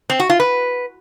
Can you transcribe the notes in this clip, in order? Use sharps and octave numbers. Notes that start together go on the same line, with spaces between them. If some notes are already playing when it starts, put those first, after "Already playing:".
C4
F#4
F4
B4